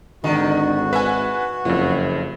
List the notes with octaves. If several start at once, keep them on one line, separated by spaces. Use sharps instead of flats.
G#1 D3 D#3 F#4
B4 E5 F#5 G#5
F#1 F2 F3